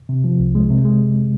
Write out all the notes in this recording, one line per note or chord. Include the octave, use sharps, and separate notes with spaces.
C3
F3
C2
G#3
C3
G#3